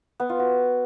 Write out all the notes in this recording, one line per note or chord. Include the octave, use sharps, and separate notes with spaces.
B3
F4
F#4